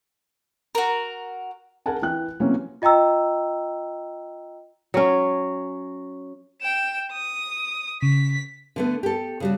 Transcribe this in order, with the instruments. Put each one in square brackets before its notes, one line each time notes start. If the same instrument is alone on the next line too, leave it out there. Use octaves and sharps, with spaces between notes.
[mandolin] F#4 A#4
[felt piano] G#4 A#4 F#5 G#5 A5
E3 G5 F#6
C3 E3 F#3 A#3 C4 C#4
[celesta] F4 D#5 G5 A#5 E6
[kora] F#3 C#4
[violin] G5 E7
D#6
[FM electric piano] C#3 [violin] B6
[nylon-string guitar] D3 A3 B3
G4 A4
C#3 G3 F#4